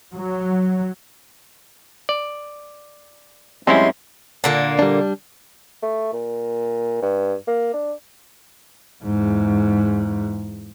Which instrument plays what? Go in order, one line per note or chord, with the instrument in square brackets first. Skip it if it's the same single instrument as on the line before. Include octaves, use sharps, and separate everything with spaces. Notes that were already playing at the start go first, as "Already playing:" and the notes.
[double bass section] F#3
[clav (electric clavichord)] D5
[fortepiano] F#2 C4 D#5 [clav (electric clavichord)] G3 C#4 E4 [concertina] G#3 C6
[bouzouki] A#2 D3 A#3
[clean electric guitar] G3 D4
[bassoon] A3
A#2
G2
A#3
D4
[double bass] E2 G#2